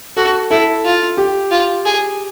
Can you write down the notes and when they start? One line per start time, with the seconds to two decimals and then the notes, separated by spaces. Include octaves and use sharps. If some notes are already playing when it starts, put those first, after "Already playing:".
0.17 F#4 A4
0.51 E4 A4
0.84 F4
1.17 G4
1.51 F4
1.85 G#4